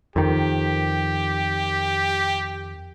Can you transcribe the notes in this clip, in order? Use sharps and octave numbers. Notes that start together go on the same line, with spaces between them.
F2 D#3 G4